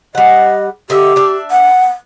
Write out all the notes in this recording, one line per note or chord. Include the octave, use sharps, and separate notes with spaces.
G3 D#5 F#5
D3 G4 D#5 E5
D4 D5 E5
F#5